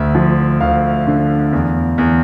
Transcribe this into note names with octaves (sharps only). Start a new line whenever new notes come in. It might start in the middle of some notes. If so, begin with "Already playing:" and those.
Already playing: D2 E5
F3
D2 F5
D3
E2
E2